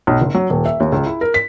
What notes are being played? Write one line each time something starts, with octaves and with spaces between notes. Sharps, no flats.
B1
F#1
F#3
D#1
E5
D#2
C#2
E4
A#4
B6